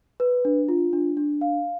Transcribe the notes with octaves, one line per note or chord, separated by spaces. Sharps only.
B4
D4
F4
D4
D4
F5